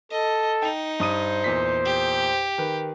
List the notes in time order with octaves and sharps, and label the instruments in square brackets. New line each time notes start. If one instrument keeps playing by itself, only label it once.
[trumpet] A4 [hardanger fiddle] D#5
[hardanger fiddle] D#4 [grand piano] G5 F7
[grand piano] G2 D#6 D#7 [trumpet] C5
[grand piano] E2 A#2 B6
[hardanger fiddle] G4
[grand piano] D#3 B4